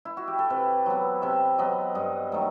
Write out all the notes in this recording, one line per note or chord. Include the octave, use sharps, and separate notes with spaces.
E4
F#4
G4
A4
C3 B4
F#3 B3
C3 E5
F#3 B3 D#5
G2 D#5
D#3 F#3 A3